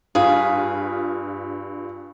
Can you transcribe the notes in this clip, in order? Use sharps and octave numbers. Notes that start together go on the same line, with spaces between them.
G2 F4 G#4 B4 F5